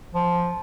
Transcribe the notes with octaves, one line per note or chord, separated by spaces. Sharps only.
F3